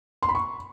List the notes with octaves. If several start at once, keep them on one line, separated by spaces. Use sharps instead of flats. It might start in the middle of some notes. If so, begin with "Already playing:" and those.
C6
B5
C#6